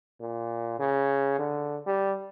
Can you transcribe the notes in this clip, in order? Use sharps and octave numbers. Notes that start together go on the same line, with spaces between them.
A#2
C#3
D3
G3